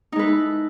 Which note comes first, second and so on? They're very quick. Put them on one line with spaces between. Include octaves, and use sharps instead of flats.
D#4 G#3 B4 E4 A4